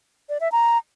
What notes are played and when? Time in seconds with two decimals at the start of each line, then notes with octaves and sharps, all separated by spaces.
0.29 D5
0.40 E5
0.52 A#5